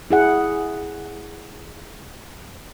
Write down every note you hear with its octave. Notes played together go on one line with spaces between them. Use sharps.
E4 G#4 F#5